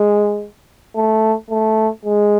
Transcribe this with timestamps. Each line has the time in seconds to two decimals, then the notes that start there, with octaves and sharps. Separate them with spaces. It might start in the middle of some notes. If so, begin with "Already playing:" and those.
Already playing: G#3
0.96 A3
1.50 A3
2.05 G#3